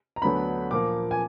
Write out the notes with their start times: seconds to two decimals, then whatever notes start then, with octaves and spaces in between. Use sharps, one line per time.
0.16 A#5
0.22 D2 D3 F#3 B3 D4 B5
0.71 A#2 F3 A#3 D6
1.11 G#5